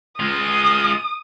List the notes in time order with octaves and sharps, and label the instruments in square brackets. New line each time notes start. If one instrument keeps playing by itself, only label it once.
[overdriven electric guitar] G#3 F4 [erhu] D#6